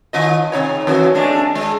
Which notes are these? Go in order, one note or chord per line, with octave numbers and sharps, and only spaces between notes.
D#3 F4 D#5
C3 D#4 C#5
F2 E3 F#4
G#3 A3 D4
G#3